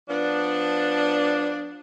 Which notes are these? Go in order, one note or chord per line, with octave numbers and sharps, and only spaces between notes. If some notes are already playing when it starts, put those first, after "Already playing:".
F3 B3 D4